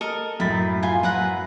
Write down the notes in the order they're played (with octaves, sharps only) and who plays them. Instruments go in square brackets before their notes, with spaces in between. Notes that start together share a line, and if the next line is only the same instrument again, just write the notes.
[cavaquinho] A4 A#4 D#5
[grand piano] F#2 A2 A6 [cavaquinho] B5
[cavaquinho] F4 G#5
[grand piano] F#2 [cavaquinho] B4 F#5 A#5